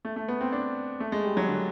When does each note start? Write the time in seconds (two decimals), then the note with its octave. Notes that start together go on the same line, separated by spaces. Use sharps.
0.05 A3
0.16 A3
0.28 B3
0.41 C4
0.52 D4
1.00 A3
1.12 G#3
1.24 G3
1.37 F#3
1.48 D3